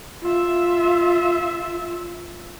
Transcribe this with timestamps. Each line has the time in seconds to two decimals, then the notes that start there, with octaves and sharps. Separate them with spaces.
0.22 F4 E5